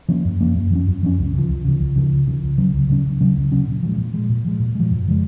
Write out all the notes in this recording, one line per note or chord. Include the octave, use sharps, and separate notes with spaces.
F3 A#3 C#4
F#2
F3 A#3 C#4
F#2
F3 A#3 C#4
F#2
F3 A#3 C#4
C#2
C#3 F3
C#2
C#3 F3
C#2
C#3 F3
C#2
C#3 F3
C#2
C#3 F#3 C#4
C#2
C#3 F#3 C#4
C#2
C#3 F#3 C#4
C#2
C#3 F#3 C#4
A#2
F3 G#3
A#2
F3 G#3
A#2
F3 G#3
A#2
F3 G#3
F#2
C#3 F3 G#3